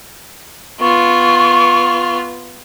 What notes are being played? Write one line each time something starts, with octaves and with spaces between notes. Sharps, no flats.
B3 F4 C#6